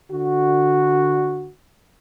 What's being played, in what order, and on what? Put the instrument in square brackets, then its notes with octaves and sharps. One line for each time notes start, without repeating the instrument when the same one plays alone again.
[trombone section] D3 F#4